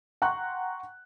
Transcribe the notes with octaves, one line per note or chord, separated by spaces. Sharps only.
F#5 G5 A#5 C6 C#6 F#6